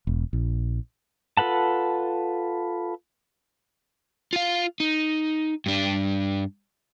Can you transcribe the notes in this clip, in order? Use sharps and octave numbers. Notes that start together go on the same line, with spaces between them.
E1
A#1
F4 A4 B4 F#5 A5
F4 F5
D#4
G2 D4